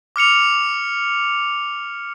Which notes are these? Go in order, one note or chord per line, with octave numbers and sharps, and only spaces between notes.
D6 F6 C#7 F7